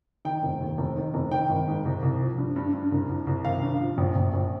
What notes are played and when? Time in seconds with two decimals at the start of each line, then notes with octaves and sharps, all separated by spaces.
0.25 D#3 G5
0.43 F1
0.61 D#2
0.78 F1
0.96 D#3
1.14 F1
1.31 D#3 G5
1.49 G#1
1.68 G#2
1.85 C2
2.02 C2
2.20 F3
2.38 G2
2.56 G2
2.73 G2
2.92 C2
3.09 C2
3.27 C2
3.44 G#1 F5
3.62 G2
3.80 F3
3.98 A#1
4.16 A#1
4.34 A#1